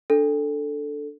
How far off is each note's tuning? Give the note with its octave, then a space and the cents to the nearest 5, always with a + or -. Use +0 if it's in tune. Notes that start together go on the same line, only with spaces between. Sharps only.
D4 +0 A4 +0